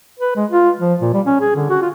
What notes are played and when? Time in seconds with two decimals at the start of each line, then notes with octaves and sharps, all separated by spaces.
0.19 B4
0.36 G#3
0.51 F4
0.80 F3
1.01 A#2
1.14 G3
1.26 C#4
1.41 G#4
1.56 D3
1.69 F#4
1.82 F4